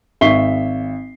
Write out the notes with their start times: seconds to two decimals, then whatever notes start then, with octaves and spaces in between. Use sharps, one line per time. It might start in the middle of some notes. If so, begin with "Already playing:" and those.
0.21 G#1 E5 C#6 B6 C7 G7